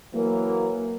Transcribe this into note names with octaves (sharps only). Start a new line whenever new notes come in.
E3 F#3 A#3